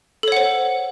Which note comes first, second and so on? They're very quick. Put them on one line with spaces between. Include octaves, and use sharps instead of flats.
A4 C#5 F#5 C5